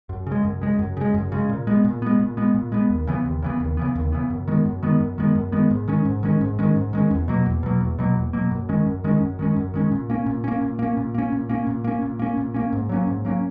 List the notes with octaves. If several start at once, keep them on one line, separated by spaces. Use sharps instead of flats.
F#2
C#3
G#3
F#2
C#3 G#3
F#2
C#3 G#3
F#2
C#3 G#3
A#2
G#3 B3
A#2
G#3 B3
A#2
G#3 B3
A#2
G#3 B3
D#2
C#3 E3 B3
D#2
C#3 E3 B3
D#2
C#3 E3 B3
D#2
C#3 E3 B3
F#2
D#3 G#3 B3
F#2
D#3 G#3 B3
F#2
D#3 G#3 B3
F#2
D#3 G#3 B3
G#2
D#3 G#3 C#4
G#2
D#3 G#3 C#4
G#2
D#3 G#3 C#4
G#2
D#3 G#3 C#4
E2
B2 F#3 A#3
E2
B2 F#3 A#3
E2
B2 F#3 A#3
E2
B2 F#3 A#3
F#2
D#3 G#3 C#4
F#2
D#3 G#3 C#4
F#2
D#3 G#3 C#4
F#2
D#3 G#3 C#4
A#2
A#3 C#4
A#2
A#3 C#4
A#2
A#3 C#4
A#2
A#3 C#4
A#2
A#3 C#4
A#2
A#3 C#4
A#2
A#3 C#4
A#2
A#3 C#4
G#2
F#3 A#3 C#4
G#2
F#3 A#3 C#4